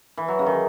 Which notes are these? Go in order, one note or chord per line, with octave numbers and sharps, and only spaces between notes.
E3
F#3
C#3
D#3